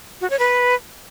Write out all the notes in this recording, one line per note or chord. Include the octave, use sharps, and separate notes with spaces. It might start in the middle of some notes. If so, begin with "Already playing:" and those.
F#4
C#5
B4